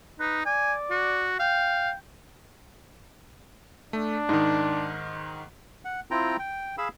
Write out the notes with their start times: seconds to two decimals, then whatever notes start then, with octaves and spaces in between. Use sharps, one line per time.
0.20 D#4 B4
0.46 D5 G#5
0.91 F#4
1.40 F5 G5
3.93 A3 D4
4.29 G#2 D#3 D#4
5.85 F#5
6.11 C4 E4 F4 G5 A#5
6.39 G5
6.78 G#4 F5 B5 E6